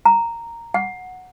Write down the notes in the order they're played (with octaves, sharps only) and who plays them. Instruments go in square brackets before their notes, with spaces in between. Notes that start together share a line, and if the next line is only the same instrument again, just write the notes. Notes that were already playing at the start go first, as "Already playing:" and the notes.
[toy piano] A#5
F#5